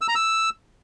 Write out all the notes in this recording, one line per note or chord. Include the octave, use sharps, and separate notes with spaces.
E6
A#5
E6